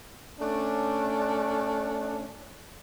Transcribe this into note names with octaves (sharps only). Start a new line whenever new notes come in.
A3 C#4 D4